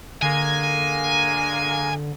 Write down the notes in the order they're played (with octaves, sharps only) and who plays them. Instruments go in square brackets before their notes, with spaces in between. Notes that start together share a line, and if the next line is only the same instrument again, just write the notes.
[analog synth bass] D3 [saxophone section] G#3 A#3 [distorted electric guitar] G#5